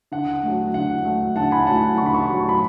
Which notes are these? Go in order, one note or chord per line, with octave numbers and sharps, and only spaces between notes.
D3 F#5
F#3 A3
D3 F#5
F#3 A3
D3 F#5 A5
G#5 B5
F#3 A3 F#5 A5
D3 C#6
B5
A5 C#6
F#3 A3
B5